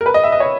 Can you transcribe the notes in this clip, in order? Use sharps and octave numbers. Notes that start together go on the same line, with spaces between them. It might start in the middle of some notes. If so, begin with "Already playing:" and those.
A#4
B4
D#5
E5
D#5
C#5